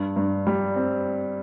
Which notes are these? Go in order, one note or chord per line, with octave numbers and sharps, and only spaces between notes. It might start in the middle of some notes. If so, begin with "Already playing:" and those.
Already playing: G2
G2
G3
C4